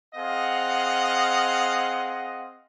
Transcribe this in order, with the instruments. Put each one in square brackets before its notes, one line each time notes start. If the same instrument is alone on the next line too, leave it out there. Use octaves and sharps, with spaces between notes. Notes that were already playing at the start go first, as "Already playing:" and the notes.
[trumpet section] C4 G#4 D#5 F5 F#5